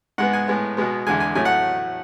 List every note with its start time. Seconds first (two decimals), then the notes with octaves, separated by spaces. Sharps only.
0.18 G#2 G#3 B3 F#5
0.33 G#5
0.48 A2 G#3 B3
0.77 B2 G#3 B3
1.07 E2 D3 G#3 G#5
1.20 G#5
1.35 A2 F#3 A3 G#5
1.45 F#5